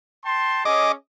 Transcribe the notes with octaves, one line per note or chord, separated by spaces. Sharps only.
G5 A5 C6
C#4 G#4 D#5 D6